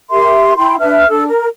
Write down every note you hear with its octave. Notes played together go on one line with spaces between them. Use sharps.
G4 A#4 E5 C6
E4 G5 C6
D4 B4 E5 F6
D4 A4
A#4